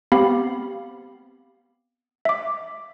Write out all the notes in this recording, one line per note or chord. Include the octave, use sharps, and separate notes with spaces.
B3 C4 G4 F5 B5
E5 D6